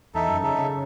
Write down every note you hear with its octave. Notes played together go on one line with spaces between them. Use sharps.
E2 D#4 A4 E5
F#2
C#3 D#4 A4 E5
C#3